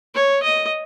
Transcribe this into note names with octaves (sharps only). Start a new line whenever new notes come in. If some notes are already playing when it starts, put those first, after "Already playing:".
C#5
D#5